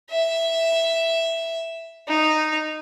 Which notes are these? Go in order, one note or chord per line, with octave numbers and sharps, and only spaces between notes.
E5
D#4